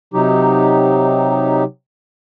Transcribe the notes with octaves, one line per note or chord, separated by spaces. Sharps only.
C3 F#3 D#4 G4